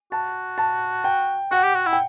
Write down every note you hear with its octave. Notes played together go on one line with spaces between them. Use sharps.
F#4 A5
A5
G5
F#4 F#5
G4
F#4
E4
G5